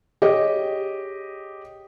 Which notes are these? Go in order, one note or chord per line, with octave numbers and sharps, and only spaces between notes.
G4 G#4 C#5 D#5